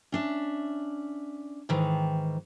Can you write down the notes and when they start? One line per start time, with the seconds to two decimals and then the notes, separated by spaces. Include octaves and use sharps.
0.12 C#4 D4 E5
1.69 G#2 D#3 E3